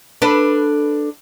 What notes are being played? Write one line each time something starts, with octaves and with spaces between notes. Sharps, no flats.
D4 A4 B4